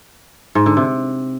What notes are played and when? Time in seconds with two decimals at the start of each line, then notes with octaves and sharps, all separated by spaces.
0.55 G#2
0.66 D3
0.77 C3